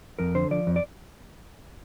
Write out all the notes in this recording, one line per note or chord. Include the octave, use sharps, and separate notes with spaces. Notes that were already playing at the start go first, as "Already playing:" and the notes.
F2 A#4
D3 C5
F3 D5
F2
D5